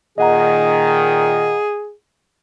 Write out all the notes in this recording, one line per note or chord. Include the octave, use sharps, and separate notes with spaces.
A#2 D#3 G#4 D#5 F#5 A#5